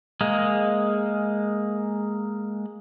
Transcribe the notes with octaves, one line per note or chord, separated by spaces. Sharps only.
G#3 A#3